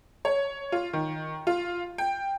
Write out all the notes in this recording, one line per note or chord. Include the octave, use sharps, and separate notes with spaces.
C#5
F4
D#3
F4
G5